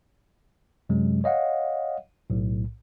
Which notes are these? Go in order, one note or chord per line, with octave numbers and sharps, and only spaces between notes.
F#2 C3 F#3 G#3
C#5 D#5 F5 F#5
B1 A2